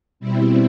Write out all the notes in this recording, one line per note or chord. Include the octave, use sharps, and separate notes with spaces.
B2 G3 C4 E4